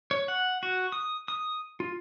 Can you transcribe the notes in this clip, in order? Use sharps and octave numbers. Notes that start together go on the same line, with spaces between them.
C#5
F#5
F#4
D#6
D#6
F4